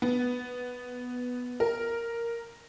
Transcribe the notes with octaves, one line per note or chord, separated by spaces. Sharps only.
B3
A#4